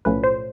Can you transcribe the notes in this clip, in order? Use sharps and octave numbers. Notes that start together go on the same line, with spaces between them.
B1 A2 F3 A3 C#4 B4
C5